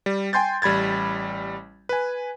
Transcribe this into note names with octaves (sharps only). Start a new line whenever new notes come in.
G3
G5 G#5 C6 G6 A6
A1 G3 B5 G#6 A6
B4 G#5